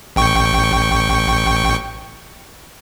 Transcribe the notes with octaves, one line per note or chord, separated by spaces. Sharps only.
A1 G5 C#6